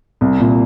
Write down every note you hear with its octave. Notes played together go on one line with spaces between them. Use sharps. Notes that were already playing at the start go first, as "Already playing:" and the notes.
C2
A#2